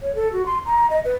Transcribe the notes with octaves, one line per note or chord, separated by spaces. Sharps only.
C#5
A4
F#4
C6
A#5
D#5
B4